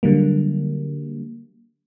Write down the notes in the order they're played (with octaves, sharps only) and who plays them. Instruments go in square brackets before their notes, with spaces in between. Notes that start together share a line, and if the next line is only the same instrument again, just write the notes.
[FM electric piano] D3 F#3 G3 A#3